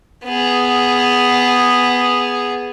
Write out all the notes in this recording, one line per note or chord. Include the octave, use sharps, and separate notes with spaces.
B3 G#4